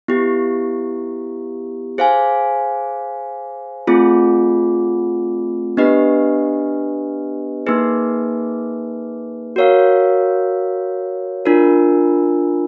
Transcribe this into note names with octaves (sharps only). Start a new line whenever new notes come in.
B3 E4 G4
G#4 C5 F5 G#5
A3 C4 F4 G#4
B3 D4 G4 B4 D#5
A#3 D#4 G#4 B4
F#4 A#4 C#5 F5
D4 F4 A#4